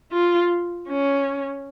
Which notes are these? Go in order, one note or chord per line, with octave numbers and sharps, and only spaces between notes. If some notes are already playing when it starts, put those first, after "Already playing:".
F4
C#4